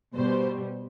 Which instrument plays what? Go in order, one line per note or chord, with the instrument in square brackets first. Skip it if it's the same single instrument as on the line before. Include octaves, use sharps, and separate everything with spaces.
[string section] B2 G3 C5